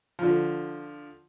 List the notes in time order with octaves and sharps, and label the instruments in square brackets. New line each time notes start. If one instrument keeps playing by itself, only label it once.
[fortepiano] D3 F3